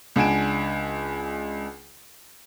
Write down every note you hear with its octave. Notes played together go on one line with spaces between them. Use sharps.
C#2 D4 F#5 G#5 D7 E7